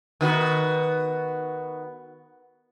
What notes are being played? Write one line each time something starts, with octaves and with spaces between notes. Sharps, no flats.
D#3 B3 F#4